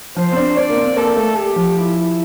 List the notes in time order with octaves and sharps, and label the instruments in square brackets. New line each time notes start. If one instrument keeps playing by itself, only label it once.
[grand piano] F3 [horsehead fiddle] C5
[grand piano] C4
D4
[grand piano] D4 [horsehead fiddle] D5
[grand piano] A#3
C4
[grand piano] A#3 [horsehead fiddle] A4
[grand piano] A3
[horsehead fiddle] G4
[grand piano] F3
[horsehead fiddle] E4